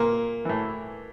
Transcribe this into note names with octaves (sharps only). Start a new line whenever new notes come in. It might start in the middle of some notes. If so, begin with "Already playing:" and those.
Already playing: A#2 A#3
A2 E3